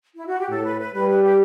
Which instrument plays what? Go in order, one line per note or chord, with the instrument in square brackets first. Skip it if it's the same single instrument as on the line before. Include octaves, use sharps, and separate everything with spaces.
[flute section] E4
F#4
G4
[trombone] A2 [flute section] A4
[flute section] B4
B4
[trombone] G3 [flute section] B4
[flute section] B4
G4